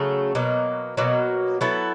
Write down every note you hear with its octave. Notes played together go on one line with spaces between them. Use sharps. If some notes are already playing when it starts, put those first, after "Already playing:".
Already playing: C#3 F#3 A3
B2 F#3 A#3
B2 F#3 A#3
F#3 B3 E4 A4